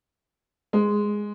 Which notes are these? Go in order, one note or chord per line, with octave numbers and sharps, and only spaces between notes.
G#3